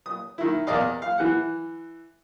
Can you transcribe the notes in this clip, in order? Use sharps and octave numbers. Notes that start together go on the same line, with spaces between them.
D#6
D#3 E4
E2 A#4 D5 D#5 F5
F5
E3 F#5